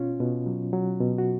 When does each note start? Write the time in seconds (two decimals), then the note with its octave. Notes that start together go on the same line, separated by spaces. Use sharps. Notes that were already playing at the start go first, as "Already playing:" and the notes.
Already playing: B2 C#4 F4
0.20 B2
0.46 F#3
0.73 F#3
1.00 B2
1.18 F#4